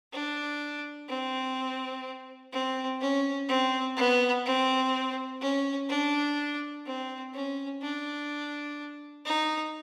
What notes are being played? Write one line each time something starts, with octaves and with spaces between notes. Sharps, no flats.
D4
C4
C4
C#4
C4
B3
C4
C#4
D4
C4
C#4
D4
D#4